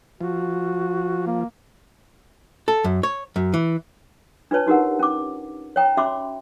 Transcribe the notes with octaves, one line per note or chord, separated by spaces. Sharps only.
F3 F#4
A#3
A4
F#2
C#5
F#2
E3
D4 F4 B4 C#5 A5
D#4 F#4 G4 A#4 F#5
C#4 D6
C#5 G5 A#5
C#4 F#4 E5 B5 C6 D6